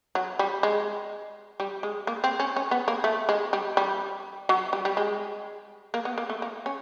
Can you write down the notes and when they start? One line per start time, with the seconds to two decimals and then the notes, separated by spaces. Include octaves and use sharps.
0.15 F#3
0.39 G3
0.63 G#3
1.60 G3
1.83 G#3
2.07 A#3
2.24 C4
2.40 C#4
2.56 C#4
2.71 B3
2.88 A#3
3.04 A3
3.29 G#3
3.53 G3
3.77 G3
4.49 F#3
4.73 G3
4.85 G3
4.97 G#3
5.94 A#3
6.05 B3
6.18 A#3
6.30 A3
6.42 A#3
6.66 C#4